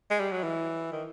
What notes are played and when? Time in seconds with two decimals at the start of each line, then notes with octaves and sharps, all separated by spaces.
0.10 G#3
0.20 G3
0.32 F#3
0.43 E3
0.92 D#3